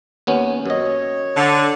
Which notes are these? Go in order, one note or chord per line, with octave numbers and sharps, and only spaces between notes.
D#2 B3 C#4
F#2 C#5 D#5
D3